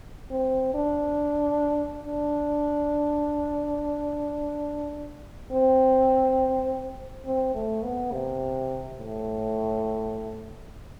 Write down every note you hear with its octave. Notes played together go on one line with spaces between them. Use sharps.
C4
D4
D4
C4
C4
A3
B3
C3
A2